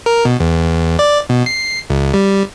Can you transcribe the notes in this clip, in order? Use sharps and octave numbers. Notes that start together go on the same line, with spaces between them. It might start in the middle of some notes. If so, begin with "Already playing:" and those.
A#4
B2
E2
D5
B2
C7
C#2
G3